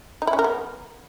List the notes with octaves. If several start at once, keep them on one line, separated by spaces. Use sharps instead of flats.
D#4
E4
C#4
A#4
B3